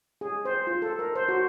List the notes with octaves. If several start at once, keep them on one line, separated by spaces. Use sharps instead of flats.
G#4
C5
F4
A4
A#4
C5
F#4